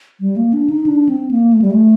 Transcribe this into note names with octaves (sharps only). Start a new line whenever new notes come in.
G3
A#3
D4
D#4
D4
C4
A#3
A3
G3
A3